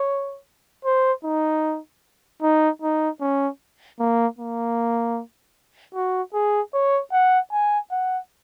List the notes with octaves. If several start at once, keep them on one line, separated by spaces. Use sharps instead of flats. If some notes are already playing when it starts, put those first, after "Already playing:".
Already playing: C#5
C5
D#4
D#4
D#4
C#4
A#3
A#3
F#4
G#4
C#5
F#5
G#5
F#5